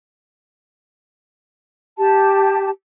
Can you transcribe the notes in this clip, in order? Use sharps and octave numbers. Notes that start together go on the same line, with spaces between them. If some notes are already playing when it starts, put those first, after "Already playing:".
G4 A5